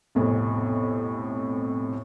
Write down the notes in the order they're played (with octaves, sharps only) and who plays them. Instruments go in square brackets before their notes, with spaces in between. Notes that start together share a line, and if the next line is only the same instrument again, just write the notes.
[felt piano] B1 F2 A2 C3